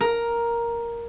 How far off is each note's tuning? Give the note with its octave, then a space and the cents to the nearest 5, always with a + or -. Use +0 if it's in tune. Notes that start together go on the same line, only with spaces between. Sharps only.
A#4 +5